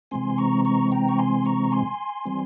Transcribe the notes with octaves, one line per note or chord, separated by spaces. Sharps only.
C3 E3 G#3 C4 G#5 C6
A#5 C#6
A#5 C#6
G5 A#5
C#6
G#5 C6
A#5 C#6
G#5 C6
E3 G3 C4